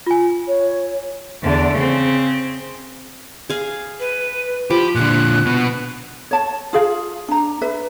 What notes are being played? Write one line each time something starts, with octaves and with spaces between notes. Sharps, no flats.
F4 G#5
C#5
E2 D3
C#3 C4
G#4 F5
B4
F3 G4 B5
A#2 D3 F#6
B2 B3
C#5 A5
F4 G#4 F5
D4 A#5
B4 E5